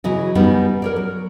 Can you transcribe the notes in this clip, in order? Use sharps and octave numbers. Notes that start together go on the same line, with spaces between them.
C#3 E3 F#3 D#5
F#2 G3 B3 C#4 D#4
A#4 C#5 D5
F#3